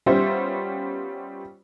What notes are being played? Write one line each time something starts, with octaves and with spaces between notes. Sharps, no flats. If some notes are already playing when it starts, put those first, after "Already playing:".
G3 B3 C#4 F4 C5 E5